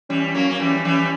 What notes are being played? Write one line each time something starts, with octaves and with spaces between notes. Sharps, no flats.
E3 G3 C#4
F#3 A#3
A#3
E3 G3
E3 G3